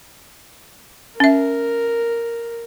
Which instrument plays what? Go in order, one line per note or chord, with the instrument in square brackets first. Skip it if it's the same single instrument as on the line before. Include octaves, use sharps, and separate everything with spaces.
[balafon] C#4 E5 [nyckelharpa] A#4